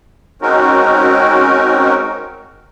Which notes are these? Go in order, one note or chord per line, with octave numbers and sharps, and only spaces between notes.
G#3 C4 C#4 D#4 F#4 A#4